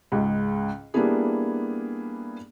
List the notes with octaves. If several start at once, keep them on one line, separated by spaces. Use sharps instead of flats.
C#2 G#2
G3 A#3 B3 D4 E4 G#4